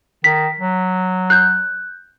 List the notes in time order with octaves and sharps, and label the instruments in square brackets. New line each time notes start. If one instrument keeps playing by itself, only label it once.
[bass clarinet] D#3 [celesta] B6
[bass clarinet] F#3
[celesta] F#6 G6